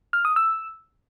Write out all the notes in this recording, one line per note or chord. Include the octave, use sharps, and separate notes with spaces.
F6
D#6
E6